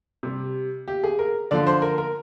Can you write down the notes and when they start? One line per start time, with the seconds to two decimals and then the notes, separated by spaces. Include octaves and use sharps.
0.23 C3 G3
0.88 G4
1.04 G#4
1.19 A#4
1.51 D3 F3 D5
1.67 C5
1.82 A#4
1.98 A#4